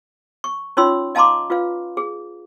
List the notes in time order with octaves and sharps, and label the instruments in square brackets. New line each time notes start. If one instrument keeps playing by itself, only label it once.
[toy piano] C#6
C#4 D#4 F4 C#5 C6 E6
D#5 F5 A5 A#5 C6 D6
F4 B4 F5
G#4